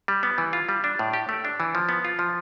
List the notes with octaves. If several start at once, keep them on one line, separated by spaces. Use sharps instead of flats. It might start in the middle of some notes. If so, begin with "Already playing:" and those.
G3
B3
E3
F4
G3
D4
A2
G4
A3
D4
E3
F3
B3
F4
F3